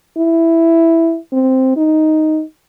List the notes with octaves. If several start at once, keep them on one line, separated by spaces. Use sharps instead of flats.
E4
C4
D#4